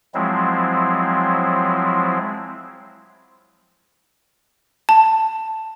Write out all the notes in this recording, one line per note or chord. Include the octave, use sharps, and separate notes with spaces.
F3 F#3 G#3 C4 E4
A5